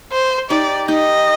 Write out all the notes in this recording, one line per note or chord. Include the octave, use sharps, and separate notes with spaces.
C5
D#4 G4 D5
D#4 G4 D#5